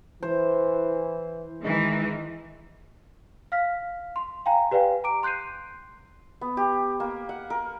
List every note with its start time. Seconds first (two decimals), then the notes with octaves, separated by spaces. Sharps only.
0.23 E3 C5
1.62 D#3 E3 G#3
3.52 F5 F6 B6
4.16 C6
4.46 F5 G5 G#5 A#5
4.71 G4 B4 D5 F5 G5 G#5
5.04 A#5 D6 D7
5.23 C6 F#6 G6 C7 D#7
6.41 B3
6.57 G4
7.00 A#3
7.29 F#5
7.50 A#4